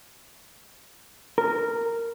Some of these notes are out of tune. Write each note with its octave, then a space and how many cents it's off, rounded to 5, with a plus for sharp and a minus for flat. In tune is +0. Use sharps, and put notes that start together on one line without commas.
A#4 -10